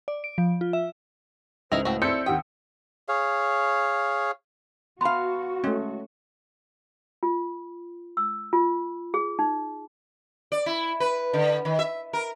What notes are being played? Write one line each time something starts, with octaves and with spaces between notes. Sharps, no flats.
D5
D7
F3
F4
E5
C#2 D#4 E4 A#4 C5 F7
A2 C4 F#4
C4 E4 A4 D5 E6 G6 C#7
D#2 G4 F#5 G5 D#6
G#4 C#5 F5
B3 F#4 F5 A5 B5 C6
G#3 A3 C#4
F4
E6
F4
G#4
D#4
D5
E4
B4
D3
D#3
E5
A#4